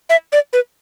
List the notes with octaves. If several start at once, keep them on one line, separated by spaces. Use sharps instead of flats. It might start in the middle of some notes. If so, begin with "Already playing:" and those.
E5
D5
B4